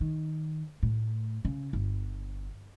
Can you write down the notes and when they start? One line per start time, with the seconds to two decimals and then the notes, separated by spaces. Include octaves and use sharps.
0.01 D#3
0.83 A2
1.45 C#3
1.73 G1